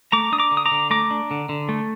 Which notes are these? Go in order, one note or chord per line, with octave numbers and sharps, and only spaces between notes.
A3 A#5 D6
D4 D#6
A#5 D6
D3
D#6
A#5 D6
D3
A3 A#5 D6
D4
D3
D3
A3